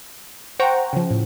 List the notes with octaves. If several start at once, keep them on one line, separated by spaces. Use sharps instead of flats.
C5 F#5 G5 A#5 C#6
C#3 F3
A2